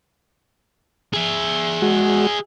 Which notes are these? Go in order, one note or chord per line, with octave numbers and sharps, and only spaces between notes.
G#4 E5
G#3 F#4